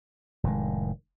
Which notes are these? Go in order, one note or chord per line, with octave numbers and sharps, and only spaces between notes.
F1 A2 D#3 G#3